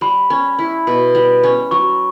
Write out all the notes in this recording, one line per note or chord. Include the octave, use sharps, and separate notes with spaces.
G3 B5
C#4
E4
B2
G3
C#4
F#3 C#6